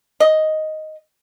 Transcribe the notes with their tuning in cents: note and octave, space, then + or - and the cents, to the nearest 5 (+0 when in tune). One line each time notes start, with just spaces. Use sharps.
D#5 +5